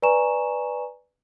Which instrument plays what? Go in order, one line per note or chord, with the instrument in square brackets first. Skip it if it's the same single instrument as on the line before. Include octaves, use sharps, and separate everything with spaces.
[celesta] B4 D5 G#5 A#5 C#6 E7